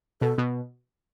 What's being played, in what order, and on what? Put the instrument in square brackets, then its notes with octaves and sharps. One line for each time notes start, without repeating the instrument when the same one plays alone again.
[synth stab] B2 [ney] A4
[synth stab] B2